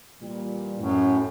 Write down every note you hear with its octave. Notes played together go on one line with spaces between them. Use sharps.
A#2 E3 G3
F#2 A2